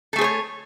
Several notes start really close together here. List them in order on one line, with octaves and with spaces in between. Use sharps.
A4 A3 G#4 C5 C#5